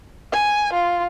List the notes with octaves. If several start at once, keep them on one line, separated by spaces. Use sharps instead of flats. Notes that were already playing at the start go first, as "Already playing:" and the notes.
G#5
F4